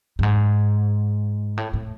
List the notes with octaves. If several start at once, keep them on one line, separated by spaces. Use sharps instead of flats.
G2
G#2
A2
A2